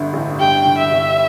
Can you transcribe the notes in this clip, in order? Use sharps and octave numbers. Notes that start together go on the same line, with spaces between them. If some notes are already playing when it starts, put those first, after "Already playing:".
Already playing: G1 G2 D3
A1
G2 G5
D3
E5
G1